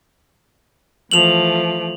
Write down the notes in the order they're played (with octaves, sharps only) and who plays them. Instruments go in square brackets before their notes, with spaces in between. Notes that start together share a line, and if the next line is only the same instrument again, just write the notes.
[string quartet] E3 F3 A3 [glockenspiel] F7 F#7